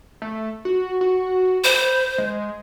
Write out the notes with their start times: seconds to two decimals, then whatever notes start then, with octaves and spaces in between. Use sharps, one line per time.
0.22 A3
0.65 F#4
1.01 F#4
1.64 C5 B5
2.18 G#3